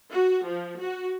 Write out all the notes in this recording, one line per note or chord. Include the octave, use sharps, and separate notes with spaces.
F#4
F3
F#4